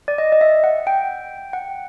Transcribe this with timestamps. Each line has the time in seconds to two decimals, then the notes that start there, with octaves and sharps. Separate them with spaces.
0.08 D5
0.18 D#5
0.32 D#5
0.41 E5
0.64 F#5
0.87 G5
1.53 F#5